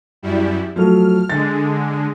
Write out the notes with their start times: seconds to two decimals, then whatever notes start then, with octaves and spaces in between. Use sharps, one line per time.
0.23 F#2 G3 E4
0.76 F3 F#3 A3 F6
1.30 D3 G#3 A6